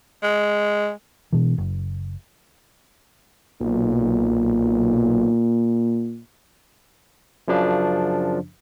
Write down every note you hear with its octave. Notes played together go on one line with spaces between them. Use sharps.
G#3
B2 E3
F#1
B1 A#2
F#2 C#3 F3 D4